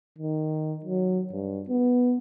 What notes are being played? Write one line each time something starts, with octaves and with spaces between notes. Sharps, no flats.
D#3
F#3
G2
B3